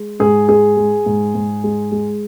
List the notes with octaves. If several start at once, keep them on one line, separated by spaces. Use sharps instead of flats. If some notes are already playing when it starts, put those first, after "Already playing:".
Already playing: G#3
G#2 G#4
G#3 G#4
G#3
G#2
G#2
G#3
G#3